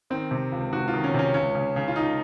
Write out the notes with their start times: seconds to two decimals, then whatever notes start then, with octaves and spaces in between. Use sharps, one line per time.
0.10 D#3 C4
0.31 C3
0.52 C#2
0.72 C#2 F#4
0.88 F4
0.93 D#3
1.04 C#4
1.14 C3 C#4
1.34 C#2 C#4
1.55 C#3
1.76 C#3
1.88 F4
1.96 C#2 D#4